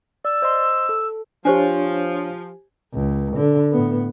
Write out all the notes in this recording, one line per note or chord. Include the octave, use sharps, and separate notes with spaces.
D5 E6
C5 D#5 C6
A4
F3 D4 G4 C5 C#5 G#5
C#2
D3
A2 B3